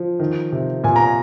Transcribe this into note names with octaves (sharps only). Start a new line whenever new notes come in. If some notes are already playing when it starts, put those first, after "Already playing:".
Already playing: F3
D#3
C3
A#2 G#5
A#5